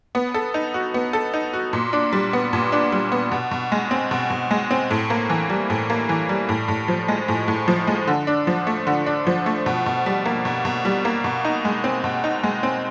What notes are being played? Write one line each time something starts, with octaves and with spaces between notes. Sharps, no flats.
B3
A4
D#4
F#4
B3
A4
D#4
F#4
A#2
D4
G3
B3
A#2
D4
G3
B3
B2
B2
G#3
C4
B2
B2
G#3
C4
A2
A#3
E3
G3
A2
A#3
E3
G3
A2
A2
F3
G#3
A2
A2
F3
G#3
D3
D4
F3
A3
D3
D4
F3
A3
B2
B2
G3
A#3
B2
B2
G3
A#3
B2
D#4
G#3
C4
B2
D#4
G#3
C4